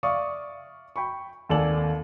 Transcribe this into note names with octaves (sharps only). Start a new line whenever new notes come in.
D5 E5 F5 C#6 D#6
G5 B5 C#6
G#1 D#2 A4 D5 G#5 F#7